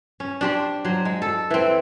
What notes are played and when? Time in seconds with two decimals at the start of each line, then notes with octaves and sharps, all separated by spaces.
0.20 C#4
0.41 D4 G4 C5
0.85 F#3 C5
1.05 G#3
1.22 A4
1.50 E3 C4